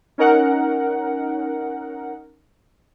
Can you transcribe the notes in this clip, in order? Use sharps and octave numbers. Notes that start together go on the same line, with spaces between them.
C#4 D#4 A#4 F#5